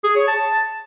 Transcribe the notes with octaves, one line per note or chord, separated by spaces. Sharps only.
G#4
C#5
A5